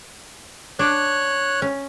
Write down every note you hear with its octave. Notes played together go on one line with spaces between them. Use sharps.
D4 C#5 F#6
C#4